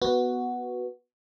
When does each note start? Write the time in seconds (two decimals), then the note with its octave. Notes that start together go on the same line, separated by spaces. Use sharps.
0.02 B3 F#4